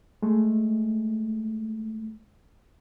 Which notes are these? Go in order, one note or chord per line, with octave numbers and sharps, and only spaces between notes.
G#3 A3